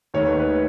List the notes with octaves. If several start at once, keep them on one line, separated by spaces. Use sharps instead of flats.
D#2 D#3 A3 C#5
B4
B4
C#5